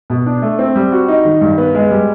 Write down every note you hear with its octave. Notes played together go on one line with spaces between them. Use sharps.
B2
D4
A3
C4
G3
F#4
D#4
D#3
G2
B3
G#3
G3